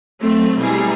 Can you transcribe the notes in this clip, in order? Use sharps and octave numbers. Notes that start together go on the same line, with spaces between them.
F#3 A3 C4
B2 G3 E4 G#4 A#5